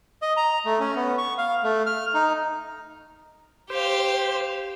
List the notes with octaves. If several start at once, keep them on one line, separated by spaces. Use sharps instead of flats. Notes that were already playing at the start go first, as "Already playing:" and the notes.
D#5
A#5
A3
C#4
B3
C#6
F5
A3
F6
D#4
G4 C5 F5